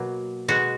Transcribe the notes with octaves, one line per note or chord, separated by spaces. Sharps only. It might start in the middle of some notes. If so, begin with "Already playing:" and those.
Already playing: B2 F#3 A#3
B2 G#3 F#4